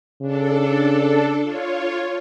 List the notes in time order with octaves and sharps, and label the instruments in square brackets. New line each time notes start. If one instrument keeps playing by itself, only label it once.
[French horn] C#3 [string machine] D4 A4
[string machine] F4 C#5